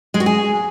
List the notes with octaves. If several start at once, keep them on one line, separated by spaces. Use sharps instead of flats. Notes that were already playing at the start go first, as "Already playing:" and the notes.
G#3
F#4
G#4